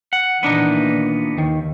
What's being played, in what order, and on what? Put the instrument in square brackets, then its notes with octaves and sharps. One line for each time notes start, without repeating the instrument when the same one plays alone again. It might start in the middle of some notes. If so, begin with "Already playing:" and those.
[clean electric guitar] F#5
[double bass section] A#2 D#3 E3 [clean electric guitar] B3 D4 D#4
[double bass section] D#2 [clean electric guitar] D#3